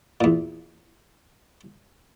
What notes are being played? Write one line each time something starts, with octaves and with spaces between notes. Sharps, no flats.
E2 A#2